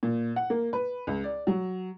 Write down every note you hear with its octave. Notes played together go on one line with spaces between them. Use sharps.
A#2
F#5
A#3
B4
C#2
D5
F#3